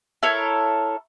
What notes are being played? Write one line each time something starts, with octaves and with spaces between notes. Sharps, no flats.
E4 A4 A#4 C#5